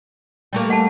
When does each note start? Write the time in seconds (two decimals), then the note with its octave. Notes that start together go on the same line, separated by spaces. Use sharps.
0.53 G3 A3 A#3
0.70 F#5 A5